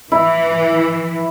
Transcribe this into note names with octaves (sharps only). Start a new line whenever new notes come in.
E3 E4